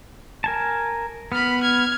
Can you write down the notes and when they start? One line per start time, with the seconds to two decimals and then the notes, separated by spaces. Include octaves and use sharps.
0.44 A#4 G#5 A5
1.32 B3 B5 F6
1.61 F6 G#6